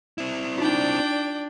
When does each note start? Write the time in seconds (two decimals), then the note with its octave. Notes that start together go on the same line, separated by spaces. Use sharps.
0.18 C4 E4
0.58 D4 D#4 F4 D5 G5